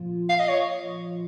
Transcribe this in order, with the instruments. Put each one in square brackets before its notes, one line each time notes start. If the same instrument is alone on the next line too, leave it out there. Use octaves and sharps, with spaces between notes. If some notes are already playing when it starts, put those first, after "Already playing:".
Already playing: [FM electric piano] A#2 F3 F4
[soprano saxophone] F5
D#5
C#5